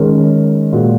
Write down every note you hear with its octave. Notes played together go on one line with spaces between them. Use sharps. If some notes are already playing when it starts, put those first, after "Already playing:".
Already playing: D#3 G#3 C#4 A#4
A#2 G#3 F#4